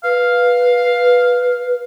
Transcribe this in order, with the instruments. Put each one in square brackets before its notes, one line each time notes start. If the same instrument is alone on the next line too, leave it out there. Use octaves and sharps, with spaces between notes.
[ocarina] B4 [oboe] F5